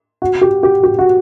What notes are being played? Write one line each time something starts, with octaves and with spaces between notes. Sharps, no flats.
F#4
G4
G4
G4
F#4